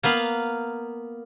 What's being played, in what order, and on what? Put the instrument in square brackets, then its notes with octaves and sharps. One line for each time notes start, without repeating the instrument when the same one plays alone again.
[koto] A#3 B3 B4 F5